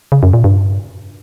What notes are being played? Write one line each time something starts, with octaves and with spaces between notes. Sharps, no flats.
C#3
F#2
A#2
G2